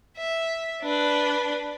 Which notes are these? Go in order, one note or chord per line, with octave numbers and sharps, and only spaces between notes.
E5
D4 B4